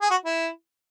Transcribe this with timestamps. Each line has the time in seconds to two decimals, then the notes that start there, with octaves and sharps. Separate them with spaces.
0.02 G#4
0.10 F#4
0.26 E4